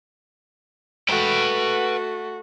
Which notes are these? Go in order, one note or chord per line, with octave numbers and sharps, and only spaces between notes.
A3 F#4 B4 G5